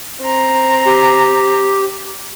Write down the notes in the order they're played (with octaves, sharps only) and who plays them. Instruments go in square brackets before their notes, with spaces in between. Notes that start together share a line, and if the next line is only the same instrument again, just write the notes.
[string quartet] C4 A#5
[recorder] G4